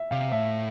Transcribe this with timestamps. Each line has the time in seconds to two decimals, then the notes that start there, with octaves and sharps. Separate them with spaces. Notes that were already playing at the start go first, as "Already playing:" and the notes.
Already playing: E5
0.11 C3 F5
0.32 A2 E5